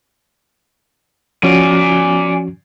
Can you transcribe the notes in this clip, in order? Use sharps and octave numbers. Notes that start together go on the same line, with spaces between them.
F3 C#4 F#4 D5 G#5